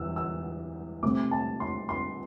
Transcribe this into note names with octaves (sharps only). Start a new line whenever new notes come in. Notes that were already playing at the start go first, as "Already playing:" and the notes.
Already playing: E2 C3 E3 E6
E6
C3 A3 C4 D6
A5
C6
C6